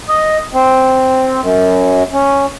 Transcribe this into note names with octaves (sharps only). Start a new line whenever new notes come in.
D#5
C4
F#2
C#4